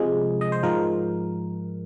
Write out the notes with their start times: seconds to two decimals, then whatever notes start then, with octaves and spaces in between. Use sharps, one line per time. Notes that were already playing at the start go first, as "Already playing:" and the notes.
Already playing: C3 F3 G#3 G#4
0.41 D#5
0.52 C5
0.63 G#2 F3 G#3 A#4